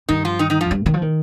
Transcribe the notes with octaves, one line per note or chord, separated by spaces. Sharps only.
G2 D#3 D#4
F3 F4
D#3 D#4
D#3 D#4
F3 F4
F2
G2
D#3
F3
D#3